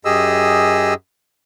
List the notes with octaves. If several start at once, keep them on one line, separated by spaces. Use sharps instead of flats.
F#2 G4 G#4 D#5 E6